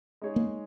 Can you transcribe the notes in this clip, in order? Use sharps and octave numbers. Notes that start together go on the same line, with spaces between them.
G#3 D#4 G#4 C#5
A#3